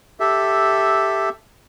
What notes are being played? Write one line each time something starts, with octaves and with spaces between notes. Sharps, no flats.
G4 A4 E5